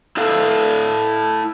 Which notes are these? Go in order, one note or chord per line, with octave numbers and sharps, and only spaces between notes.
E4 A4 F5